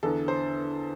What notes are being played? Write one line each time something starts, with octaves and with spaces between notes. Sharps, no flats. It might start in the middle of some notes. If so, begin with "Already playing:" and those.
E2 D3 A4
C5